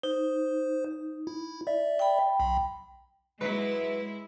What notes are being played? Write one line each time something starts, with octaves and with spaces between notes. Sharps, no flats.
D#4 C5
E4
D5 E5
G5 B5
B1
F#3 G#3 E4 B4